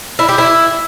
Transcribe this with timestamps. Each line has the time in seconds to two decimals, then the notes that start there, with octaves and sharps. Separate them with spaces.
0.19 E4
0.29 G4
0.38 E4